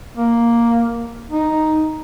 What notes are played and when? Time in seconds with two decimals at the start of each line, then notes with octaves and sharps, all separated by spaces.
0.17 A#3
1.30 D#4